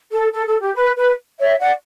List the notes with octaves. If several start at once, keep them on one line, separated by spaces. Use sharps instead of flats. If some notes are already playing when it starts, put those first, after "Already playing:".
A4
A4
A4
G4
B4
B4
C#5 E5
D5 F#5